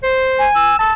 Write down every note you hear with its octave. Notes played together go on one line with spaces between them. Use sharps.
C5
G#5
E6
A5 E6